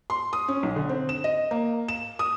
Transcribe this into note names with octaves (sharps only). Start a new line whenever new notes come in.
C6
D#6
C#4
B1
D3
C4
E7
D#5
A#3
E7
D#6